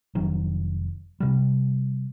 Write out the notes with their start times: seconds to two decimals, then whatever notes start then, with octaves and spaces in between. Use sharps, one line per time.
0.15 F1 D#3 F#3
1.20 C3 G3